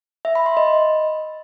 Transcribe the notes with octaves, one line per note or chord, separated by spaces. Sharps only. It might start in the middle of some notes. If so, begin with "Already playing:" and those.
E5
B5
C6
D#5